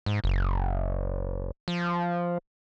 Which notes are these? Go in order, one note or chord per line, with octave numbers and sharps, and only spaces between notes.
G#2
F#1
F3